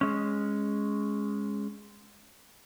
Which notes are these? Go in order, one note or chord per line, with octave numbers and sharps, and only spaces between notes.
G#3 C#4